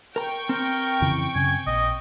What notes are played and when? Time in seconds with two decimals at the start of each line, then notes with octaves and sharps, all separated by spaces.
0.16 A#4 G5 A#5 C#6
0.49 C4 A#4
1.02 F2 C#3 E3
1.35 F#2 C#3 G#5
1.67 A#1 D#5